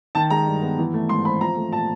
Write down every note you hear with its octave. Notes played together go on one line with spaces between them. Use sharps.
D#3 A5
G#3 A#5
G2
B3
E3
A3
G#2 C6
C4 B5
F3 A#5
A3
A#2 A5